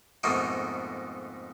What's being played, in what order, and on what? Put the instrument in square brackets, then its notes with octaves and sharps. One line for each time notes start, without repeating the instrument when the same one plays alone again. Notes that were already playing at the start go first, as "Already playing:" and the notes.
[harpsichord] F2 G#2 B2 A3 A#3 D#4